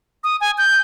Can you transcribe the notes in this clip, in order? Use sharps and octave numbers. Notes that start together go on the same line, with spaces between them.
D#6
G#5
G6